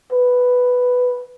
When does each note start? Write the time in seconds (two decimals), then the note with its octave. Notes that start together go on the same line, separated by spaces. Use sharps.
0.12 B4